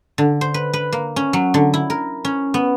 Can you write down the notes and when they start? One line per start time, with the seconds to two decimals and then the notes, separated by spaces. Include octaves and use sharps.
0.18 D3
0.41 C5
0.54 B4
0.73 B4
0.93 A#3
1.16 C#4
1.33 F#3
1.54 D3
1.74 E4
1.90 A#4
2.25 C#4
2.54 B3